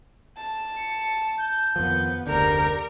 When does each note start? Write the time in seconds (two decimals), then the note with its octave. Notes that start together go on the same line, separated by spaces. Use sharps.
0.37 A5
0.77 C#7
1.38 G6
1.76 F2 D#3 F3 B3
2.27 F1 D2 D3 G3 A#4 G6